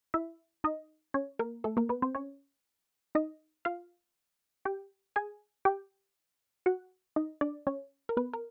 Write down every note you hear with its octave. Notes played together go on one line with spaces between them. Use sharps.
E4 E5
D#4 D#5
C#4 C#5
A#3 A#4
A3 A4
A#3 A#4
B3 B4
C4 C5
C#4 C#5
D#4 D#5
F4 F5
G4 G5
G#4 G#5
G4 G5
F#4 F#5
D#4 D#5
D4 D5
C#4 C#5
A#4
B3 B4
A#4